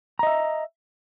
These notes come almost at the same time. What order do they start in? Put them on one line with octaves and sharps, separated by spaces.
A#5 D#5 E5